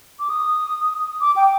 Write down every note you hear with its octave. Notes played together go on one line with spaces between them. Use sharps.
D6
D#6
D6
G5